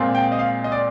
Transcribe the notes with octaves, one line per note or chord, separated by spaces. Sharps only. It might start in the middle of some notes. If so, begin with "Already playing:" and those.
Already playing: A#2 G#3 C4 F4
G5
D#5
F5
D#5
D5